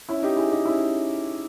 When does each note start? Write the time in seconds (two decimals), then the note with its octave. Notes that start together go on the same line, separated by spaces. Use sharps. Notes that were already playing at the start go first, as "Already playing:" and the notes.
0.09 C#4 E4
0.23 D#4 G4
0.37 E4 G#4
0.51 D#4 G4
0.66 C#4 E4